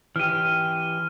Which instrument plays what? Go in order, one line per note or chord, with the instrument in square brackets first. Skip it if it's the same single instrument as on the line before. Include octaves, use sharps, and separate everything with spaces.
[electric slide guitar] E3 G4 [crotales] F6 D#7